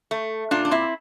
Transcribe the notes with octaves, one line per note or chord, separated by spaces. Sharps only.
A3
A#2 D4 F4
D4
C4 E4